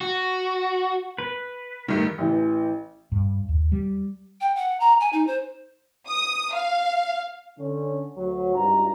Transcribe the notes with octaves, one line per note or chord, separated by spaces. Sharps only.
F#4
B4
G2 D#3 A3
A1 E3
G2
D#2
G3
G5
F#5
A#5
G#5
D#4
C5
D#6
F5
D3 C#4
D2 F#3
G#1 G2 F4 A#5